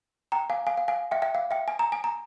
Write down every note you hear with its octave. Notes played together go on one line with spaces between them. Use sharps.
G5 A#5
F5 G#5
F5 G#5
F5
F5 G#5
E5 G5
E5 G5
F5
E5 G5
G#5
A#5
G#5
A#5